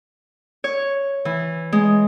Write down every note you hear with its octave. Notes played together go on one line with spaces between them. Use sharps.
C#5
E3
G#3